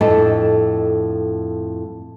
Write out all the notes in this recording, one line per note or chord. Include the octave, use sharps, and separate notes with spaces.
F2 A2 D4 A4 D#5 A5